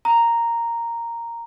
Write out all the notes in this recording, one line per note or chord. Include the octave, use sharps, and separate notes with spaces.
A#5